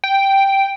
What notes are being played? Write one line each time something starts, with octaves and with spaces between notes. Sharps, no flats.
G5